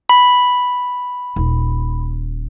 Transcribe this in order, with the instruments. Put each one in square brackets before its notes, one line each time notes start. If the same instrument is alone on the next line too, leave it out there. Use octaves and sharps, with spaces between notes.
[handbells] B5
[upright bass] D#1